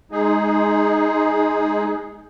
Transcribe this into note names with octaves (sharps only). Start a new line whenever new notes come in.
G#3 D#4 G#4